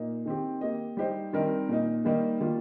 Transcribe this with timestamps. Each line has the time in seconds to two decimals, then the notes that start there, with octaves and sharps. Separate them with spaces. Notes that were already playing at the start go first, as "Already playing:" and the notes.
Already playing: A#2 A#3 D#4
0.26 D#3 C4 G4
0.61 A#3 G4 D#5
0.97 G3 D#4 G4 C5
1.33 D#3 G3 C4 D#4 A#4
1.69 A#2 A#3 D#4
2.05 D#3 G3 A#3 D#4
2.40 D#3 G3 A#3 F4